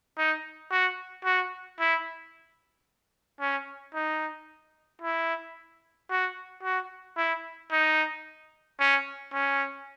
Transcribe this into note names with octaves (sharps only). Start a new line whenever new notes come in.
D#4
F#4
F#4
E4
C#4
D#4
E4
F#4
F#4
E4
D#4
C#4
C#4